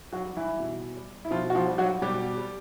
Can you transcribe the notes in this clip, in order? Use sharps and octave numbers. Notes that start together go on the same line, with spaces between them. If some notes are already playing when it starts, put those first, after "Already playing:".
F#3 F#4
G3
E3 E4
B2
G3
E4
B2 F3 F4
F#4
F3 F4
G3
F#3 F#4
B2 G3 G4
G3